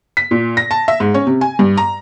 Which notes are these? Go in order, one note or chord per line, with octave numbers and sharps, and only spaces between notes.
B6
A#2
A#6
A5
E5
G#2
C#4
C3
G#5
G2
A#5